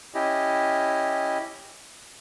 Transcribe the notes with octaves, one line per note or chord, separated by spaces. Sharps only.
C#4 E4 G4 D#5